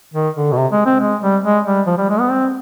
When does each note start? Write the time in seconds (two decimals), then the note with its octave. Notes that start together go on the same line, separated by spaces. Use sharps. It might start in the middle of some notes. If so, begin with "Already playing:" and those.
0.14 D#3
0.35 D3
0.52 B2
0.57 C3
0.72 G#3
0.86 C4
1.01 G#3
1.22 G3
1.45 G#3
1.66 G3
1.87 F3
1.98 G3
2.10 G#3
2.20 B3
2.31 C4